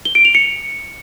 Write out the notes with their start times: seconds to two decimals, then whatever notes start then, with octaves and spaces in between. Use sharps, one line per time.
0.05 G7
0.15 D7
0.25 F7
0.35 C#7